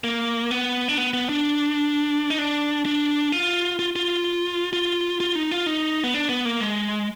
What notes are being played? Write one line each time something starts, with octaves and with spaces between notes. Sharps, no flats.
A#3
B3
D4
B3
B3
D4
D#4
D4
D4
F4
F4
F4
F4
F4
D#4
F4
D#4
B3
D4
B3
A#3
G#3